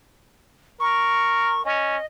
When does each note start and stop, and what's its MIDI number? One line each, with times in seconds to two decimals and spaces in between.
0.80 1.62 70
0.80 1.64 85
1.65 1.97 61
1.65 2.05 75